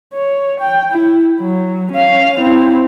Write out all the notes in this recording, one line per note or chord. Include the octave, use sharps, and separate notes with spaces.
C#5
G5
E4
F#3
C#4 F5
C4 E4